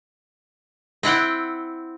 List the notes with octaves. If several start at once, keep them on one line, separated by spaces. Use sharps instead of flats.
C4 E4 F#5 G5